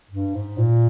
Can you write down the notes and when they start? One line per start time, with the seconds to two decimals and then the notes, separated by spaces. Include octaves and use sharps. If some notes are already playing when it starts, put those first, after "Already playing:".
0.11 G2
0.34 G#2
0.57 A#2